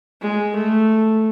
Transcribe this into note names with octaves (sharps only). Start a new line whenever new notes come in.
G#3
A3